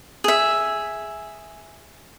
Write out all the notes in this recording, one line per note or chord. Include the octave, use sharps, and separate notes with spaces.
G#4 E5